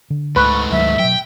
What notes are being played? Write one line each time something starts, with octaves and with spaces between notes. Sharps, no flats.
D3
C#2 G#2 A3 B4 C#6
D2 D#3 F#3 E5
B2 F#3 G5